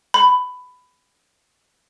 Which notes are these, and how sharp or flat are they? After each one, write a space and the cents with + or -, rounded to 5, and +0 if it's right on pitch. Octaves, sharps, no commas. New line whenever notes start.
B5 +15